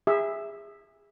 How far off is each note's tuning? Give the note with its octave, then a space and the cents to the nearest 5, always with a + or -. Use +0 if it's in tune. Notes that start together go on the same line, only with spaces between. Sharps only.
G#4 -30 E5 +0